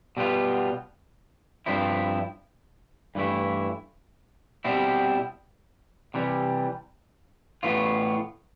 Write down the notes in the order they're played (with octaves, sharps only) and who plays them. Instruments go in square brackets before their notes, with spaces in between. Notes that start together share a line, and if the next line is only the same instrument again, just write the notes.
[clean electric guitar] B2 G3 B3 F4
G2 F3 C4 E4
G2 E3 A3 E4
B2 G3 C4 E4
C3 E3 G3
A2 E3 B3 F4